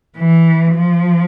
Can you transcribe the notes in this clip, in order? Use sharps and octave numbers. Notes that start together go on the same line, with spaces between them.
E3
F3